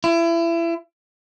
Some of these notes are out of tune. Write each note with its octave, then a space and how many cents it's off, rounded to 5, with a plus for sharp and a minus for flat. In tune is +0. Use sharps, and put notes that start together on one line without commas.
E4 +30